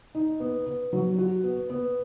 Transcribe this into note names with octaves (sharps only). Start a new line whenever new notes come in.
D#4
B3
B3
F#3
F#4
B3
B3